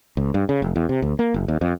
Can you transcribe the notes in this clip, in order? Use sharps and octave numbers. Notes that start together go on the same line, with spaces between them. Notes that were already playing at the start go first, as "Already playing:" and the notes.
C#2
G2
C#3
F1
E2
C3
D2
A#3
F#1
D#2
F2